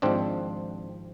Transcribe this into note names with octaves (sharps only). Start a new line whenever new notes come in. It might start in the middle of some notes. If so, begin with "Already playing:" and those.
G#1 G#2 F3 C4 D4